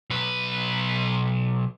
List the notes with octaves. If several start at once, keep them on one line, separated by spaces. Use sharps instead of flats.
B1 B4